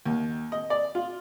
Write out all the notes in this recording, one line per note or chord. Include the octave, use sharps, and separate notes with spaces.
D#2
D#5
D5
F4